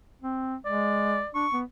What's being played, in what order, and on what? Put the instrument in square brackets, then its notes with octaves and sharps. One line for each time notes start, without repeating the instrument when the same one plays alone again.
[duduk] C4
[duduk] G#3 [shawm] D5
[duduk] D4 [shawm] C#6
[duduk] B3